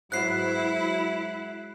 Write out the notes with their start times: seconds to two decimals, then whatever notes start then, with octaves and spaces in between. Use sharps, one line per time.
0.12 G#2 F#3 E4 F#4 B4 F#6 C7